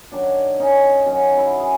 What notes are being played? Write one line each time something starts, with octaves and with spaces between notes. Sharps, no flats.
F#2 D#3 F#3 D4
C#4 D#4
F#2 D#3 F#3 C#4
E4 F#4
G#4